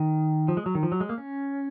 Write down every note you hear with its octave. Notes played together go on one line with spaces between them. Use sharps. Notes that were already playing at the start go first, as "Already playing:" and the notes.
Already playing: D#3
F3
G#3
F#3
D#3
F3
F#3
G#3
A#3
C#4